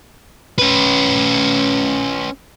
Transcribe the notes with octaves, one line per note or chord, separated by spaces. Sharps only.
C#4 B4